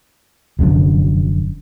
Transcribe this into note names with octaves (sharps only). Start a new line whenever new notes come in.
F1 F#2 A#2 D3